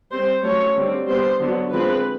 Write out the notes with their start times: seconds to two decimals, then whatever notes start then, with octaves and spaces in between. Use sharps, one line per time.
0.12 G3 C4 C5
0.44 F#3 A3 C#4 C#5
0.76 D3 G3 C4
1.08 G3 B3 D4 C5
1.40 D3 F#3 B3
1.72 D3 F3 G#3 C4 B4